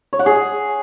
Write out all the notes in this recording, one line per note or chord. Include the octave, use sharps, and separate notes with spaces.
C#5
F#5
G#4